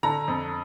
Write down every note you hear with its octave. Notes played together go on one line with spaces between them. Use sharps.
D3 A#5
F2